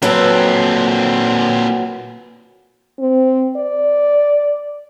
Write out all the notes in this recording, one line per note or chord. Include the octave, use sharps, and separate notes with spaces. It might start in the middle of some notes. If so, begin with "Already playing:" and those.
A#2 F#3 B3 C4 A4
C4
D5